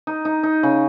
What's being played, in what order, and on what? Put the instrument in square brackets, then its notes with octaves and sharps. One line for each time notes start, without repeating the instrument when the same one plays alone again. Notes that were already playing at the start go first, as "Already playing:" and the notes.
[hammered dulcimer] D#4
D#4
D#4
C#3